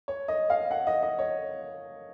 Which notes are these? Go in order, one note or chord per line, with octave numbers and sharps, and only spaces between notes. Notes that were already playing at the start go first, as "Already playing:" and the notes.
C#5
D#5
F5
F#5
D#5
D#5
C#5